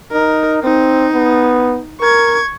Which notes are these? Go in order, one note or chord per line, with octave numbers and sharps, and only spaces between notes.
D#4 A#4
C4 D#4
B3
A#4 C#6 G#6